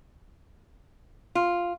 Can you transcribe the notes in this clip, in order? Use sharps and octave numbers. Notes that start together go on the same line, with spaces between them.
F4